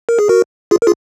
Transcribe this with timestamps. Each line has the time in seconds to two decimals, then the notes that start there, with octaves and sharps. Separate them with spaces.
0.09 A#4
0.19 G#4
0.29 F#4 A#4
0.71 F4 G#4
0.82 A#4
0.87 F4 G#4